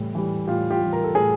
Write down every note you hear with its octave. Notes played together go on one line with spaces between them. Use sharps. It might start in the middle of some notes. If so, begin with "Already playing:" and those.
Already playing: A2 E3 G3
E3 G3
A2 F4 G4
F4 G4
E3 G3
A#4
A4
A2 G#4